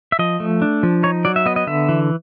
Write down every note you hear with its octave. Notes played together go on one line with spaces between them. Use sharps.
E5
F3 D#5
A3
D4
F3
D#4 C#5
F#3 D5
E5
B3 D#5
D#5
D3 E5
E3